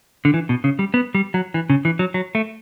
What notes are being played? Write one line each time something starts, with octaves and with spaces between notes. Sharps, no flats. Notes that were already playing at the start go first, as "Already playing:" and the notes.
D3
E3
B2
C#3
G3
B3
G3
F#3
E3
C#3
E3
F#3
F#3
A3